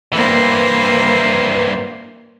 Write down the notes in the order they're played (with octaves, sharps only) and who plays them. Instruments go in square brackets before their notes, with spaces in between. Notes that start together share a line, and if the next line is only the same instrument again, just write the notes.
[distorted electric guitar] G2 E3 [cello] A#3 C5